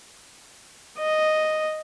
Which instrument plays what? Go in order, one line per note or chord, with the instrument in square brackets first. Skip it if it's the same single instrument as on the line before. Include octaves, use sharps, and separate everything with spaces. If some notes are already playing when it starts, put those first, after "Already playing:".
[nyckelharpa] D#5